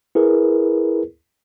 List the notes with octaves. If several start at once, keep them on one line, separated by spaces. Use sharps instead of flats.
E4 G#4 A#4 B4